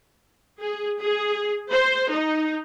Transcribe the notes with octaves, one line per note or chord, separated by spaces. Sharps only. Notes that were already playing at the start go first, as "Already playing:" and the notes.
G#4
G#4
C5
D#4